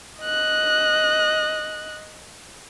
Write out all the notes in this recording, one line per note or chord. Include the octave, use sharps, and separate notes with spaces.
D#5 F#6